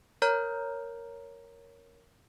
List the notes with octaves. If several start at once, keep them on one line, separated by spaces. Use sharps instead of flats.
A#4 C#5 A#5 F6 G6